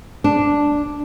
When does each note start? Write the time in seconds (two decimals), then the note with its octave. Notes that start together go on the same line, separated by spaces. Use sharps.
0.24 D4